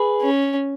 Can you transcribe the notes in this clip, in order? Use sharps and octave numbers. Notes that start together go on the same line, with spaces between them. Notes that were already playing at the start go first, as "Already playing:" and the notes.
Already playing: G#4 B4
C#4